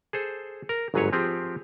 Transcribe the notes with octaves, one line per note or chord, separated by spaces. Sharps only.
G#4 A4 C5
A#4
G1 G#2 F#3 G#4 B4 C#5
F3 C4 G4 G#4